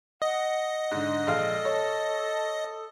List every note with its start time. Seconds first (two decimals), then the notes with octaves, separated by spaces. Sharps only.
0.22 D#5 F#5
0.91 G#2 D3
1.27 A#1 G#3 A4 F5
1.65 C#5